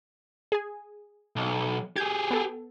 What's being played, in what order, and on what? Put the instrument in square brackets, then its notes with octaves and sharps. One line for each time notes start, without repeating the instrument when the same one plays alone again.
[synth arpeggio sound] G#4 G#5
[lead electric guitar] B1
[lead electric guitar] G4 G#4 [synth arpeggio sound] G6 G#6
[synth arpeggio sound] B3 A4